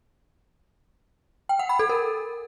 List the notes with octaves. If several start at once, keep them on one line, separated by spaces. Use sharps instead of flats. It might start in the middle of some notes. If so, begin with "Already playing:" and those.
G5
F#5
B5
A4
A#4